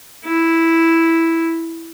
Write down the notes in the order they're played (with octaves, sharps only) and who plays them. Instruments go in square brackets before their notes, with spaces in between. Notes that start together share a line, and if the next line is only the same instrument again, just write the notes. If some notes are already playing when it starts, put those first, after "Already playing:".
[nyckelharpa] E4